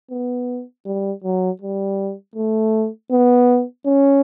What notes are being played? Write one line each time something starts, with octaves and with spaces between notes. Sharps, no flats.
B3
G3
F#3
G3
A3
B3
C#4